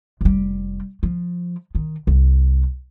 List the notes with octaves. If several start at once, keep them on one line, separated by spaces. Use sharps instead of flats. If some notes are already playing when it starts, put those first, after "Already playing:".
F1 G3
F3
D#3
C2